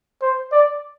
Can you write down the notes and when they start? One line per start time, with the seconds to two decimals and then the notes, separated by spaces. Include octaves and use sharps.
0.22 C5
0.52 D5